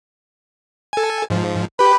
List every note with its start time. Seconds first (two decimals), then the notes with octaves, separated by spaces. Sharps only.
0.93 A4 G#5
1.30 G#2 F3
1.79 G4 B4 B5